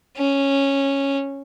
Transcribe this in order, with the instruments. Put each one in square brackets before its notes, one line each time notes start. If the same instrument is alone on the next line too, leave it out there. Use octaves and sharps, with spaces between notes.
[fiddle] C#4